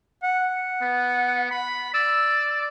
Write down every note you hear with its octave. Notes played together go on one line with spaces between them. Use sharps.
F#5
B3
B5
D5 E6